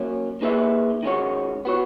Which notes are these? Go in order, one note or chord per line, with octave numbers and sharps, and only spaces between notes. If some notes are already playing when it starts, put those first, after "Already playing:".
Already playing: F#3 A#3 C#4
A#3 D#4 G#4 B4 E5
D#3 G#3 C#4 F#4 C#5
B3 F#4 C#5